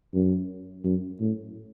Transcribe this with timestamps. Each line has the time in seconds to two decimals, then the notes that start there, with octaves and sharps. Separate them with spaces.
0.14 F#2
0.84 F#2
1.20 A2